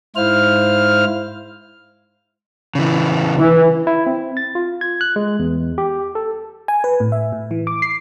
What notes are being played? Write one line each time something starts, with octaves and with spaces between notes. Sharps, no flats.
G#2 E4 C5 F5 F6
C#3 E3
E3
E4
C4
A6
F4
G#6
F#6
G#3
E2
G4
A4
G#5
B4
A2
E5
A2
E3
D6
C7